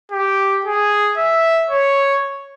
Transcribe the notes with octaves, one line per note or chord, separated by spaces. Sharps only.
G4
G#4
E5
C#5